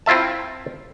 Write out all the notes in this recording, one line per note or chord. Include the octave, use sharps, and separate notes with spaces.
C4 E4 F4 E5 A5